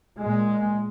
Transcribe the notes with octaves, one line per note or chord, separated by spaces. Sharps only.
A#2 G#3